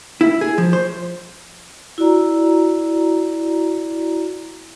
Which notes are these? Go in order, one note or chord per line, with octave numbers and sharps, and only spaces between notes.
E4
G#4
F3
C5
E4 F#4 D5 A#5